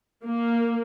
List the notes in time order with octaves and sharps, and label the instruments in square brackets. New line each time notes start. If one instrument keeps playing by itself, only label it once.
[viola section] A#3